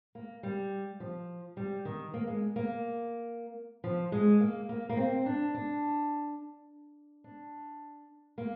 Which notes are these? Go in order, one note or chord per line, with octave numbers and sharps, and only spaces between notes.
A#3
G3
F3
G3
D#3
A#3
G#3
A#3
F3
G#3
A#3
A#3
A#3
C4
D4
D4
D4
A#3